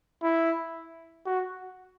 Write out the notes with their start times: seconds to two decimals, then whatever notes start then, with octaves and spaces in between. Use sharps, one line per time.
0.22 E4
1.26 F#4